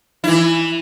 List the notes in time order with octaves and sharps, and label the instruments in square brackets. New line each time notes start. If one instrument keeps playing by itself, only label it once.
[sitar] E3 E4